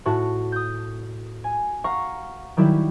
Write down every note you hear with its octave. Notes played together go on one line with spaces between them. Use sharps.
A2 F#4 A5
D#6 G6
G#5
F5 F#5 A#5 C#6
D#3 F#3 G3 E4